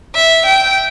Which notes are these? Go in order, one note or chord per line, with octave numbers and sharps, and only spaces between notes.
E5
G5